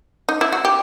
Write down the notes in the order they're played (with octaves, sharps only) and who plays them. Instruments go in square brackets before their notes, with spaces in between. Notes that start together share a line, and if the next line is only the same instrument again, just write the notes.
[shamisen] D#4
E4
F#4
G4